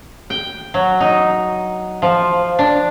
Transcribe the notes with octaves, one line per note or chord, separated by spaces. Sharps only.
G5
F#3
D#4
F3
D4